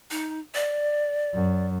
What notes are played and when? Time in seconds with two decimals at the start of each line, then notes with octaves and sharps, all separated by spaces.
0.11 D#4
0.55 D5
1.34 F#2